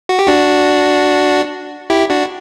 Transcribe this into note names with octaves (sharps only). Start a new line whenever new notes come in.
F#4
G4
D4 F#4
E4 G4
D4 F#4